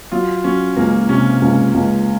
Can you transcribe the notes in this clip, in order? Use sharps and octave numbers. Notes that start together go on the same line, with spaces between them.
F#3 F4
F#3 C#4
C#2 A#3
C3 C#4
C#2
C#2